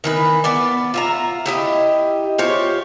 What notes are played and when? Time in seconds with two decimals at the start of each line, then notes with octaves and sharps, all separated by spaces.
0.04 D#3 E3 B4
0.44 B3 B4 D5
0.94 F4 E5 A#5
1.46 E4 G4 D#5
2.38 F4 G4 C5 C#5